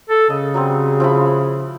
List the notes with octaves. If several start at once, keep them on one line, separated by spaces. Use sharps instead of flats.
A4
C#3 D#5
F#3 G3 C4
F3 E4 B5